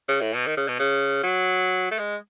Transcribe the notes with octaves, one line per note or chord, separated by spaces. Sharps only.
C#3
A2
B2
D#3
C#3
B2
C#3
F#3
A3
G#3